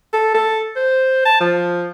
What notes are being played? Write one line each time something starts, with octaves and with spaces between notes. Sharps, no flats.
A4
A4
C5
A5
F3